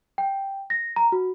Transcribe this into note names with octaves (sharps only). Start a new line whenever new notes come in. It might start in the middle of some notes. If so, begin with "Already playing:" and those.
G5
A#6
A#5
F#4